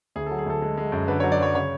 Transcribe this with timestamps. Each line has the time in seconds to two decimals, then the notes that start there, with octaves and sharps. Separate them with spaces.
0.16 D2 G#4
0.26 F#3 A4
0.39 G#4
0.46 D2 A4
0.62 G#3
0.77 G#3
0.92 F#2
1.08 D3 B4
1.20 F#3 C#5
1.32 D5
1.39 F#3 C#5
1.55 C#3 C#5